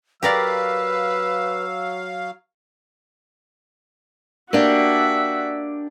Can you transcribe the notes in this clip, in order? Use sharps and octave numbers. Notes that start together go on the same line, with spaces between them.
F#3 G4 A#4 B4 D5 F5 E6
A#3 D4 F#4 G4 E5